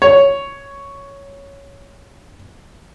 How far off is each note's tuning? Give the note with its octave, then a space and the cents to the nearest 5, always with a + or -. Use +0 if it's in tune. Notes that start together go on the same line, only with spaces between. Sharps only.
C#5 +5